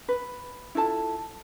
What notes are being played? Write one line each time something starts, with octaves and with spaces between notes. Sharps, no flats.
B4
E4 F4 A4 A5